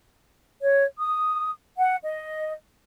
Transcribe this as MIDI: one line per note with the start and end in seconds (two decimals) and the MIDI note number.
0.62 0.85 73
0.99 1.51 87
1.77 1.95 78
2.03 2.52 75